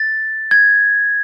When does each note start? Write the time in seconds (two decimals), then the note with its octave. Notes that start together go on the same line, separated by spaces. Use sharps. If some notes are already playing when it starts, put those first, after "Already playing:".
Already playing: A6
0.51 G#6